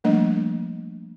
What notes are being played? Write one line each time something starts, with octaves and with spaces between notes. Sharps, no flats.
F3 G3 A3 A#3 D4 D#5